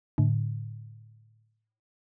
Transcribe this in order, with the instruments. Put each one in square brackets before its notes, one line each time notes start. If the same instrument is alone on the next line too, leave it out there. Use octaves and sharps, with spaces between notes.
[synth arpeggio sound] A2 D3